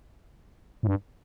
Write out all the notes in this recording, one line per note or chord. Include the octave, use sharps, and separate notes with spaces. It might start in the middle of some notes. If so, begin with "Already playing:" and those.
A2
G2